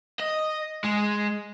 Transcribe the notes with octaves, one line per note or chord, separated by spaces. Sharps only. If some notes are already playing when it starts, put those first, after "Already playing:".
D#5
G#3